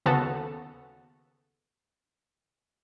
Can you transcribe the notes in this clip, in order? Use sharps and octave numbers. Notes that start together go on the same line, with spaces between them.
D#2 C#3 B3 F#4 A4